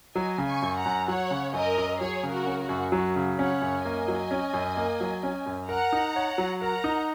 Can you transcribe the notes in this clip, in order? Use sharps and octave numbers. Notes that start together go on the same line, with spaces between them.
F#3 D#5 G#5
C#3
G#5 C#6
F#2
F#5 A#5
F#2
F#3 C#5 F#5
C#3
F#2 A#4 D#5
F#2
F#3 G#4 C#5
C#3
F#4 A#4
C#4
F#4
F#2
F#3 F#4
C#3
C#4 C#5 F#5
F#2
A#3 D#5 G#5
F#3
C#4
F#2
A#3
F#3
C#4
F#2
A#4 F#5 A#5
D#4
C#5
F#3
A#4 F#5 A#5
D#4